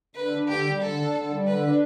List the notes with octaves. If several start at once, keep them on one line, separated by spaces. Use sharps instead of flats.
D3 B4
D4
D3 G4
G3
D3 A4
D4
D3
G3
D3 B4
D4